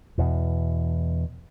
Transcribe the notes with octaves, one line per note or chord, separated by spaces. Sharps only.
E2 B2 E3